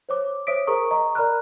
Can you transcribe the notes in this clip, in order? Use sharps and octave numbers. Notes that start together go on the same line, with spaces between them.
C5 C#5 D6
C5 C#5 E5 D#6 B6 D7
G#4 A#4 C5 A#5 C#6 D#6
D#5 A#5 C#6
A#4 D5 A#5 B5 F6 F#6